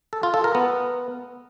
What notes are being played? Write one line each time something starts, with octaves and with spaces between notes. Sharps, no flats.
A4
F4
A4
A#4
B3